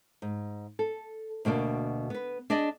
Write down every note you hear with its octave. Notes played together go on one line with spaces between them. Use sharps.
G#2
A4
D2 B2 A#3 D4
B3 B4
D4 G#4 D5 D#5